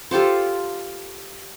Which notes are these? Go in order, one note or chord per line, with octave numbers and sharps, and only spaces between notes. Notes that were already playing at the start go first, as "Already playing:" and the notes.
F4 G4 A4 C5